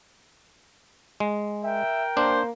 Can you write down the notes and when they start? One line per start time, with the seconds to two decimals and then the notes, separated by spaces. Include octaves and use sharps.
1.20 G#3
1.64 A#4 E5 G5
2.17 A#3 D4 C5